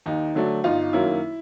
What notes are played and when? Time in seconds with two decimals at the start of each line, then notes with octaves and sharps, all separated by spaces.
0.06 D#2 D#4
0.35 D3 F#3 A3 D4
0.64 G1 D#4 F4
0.93 F#2 D#3 F#3 A#3 E4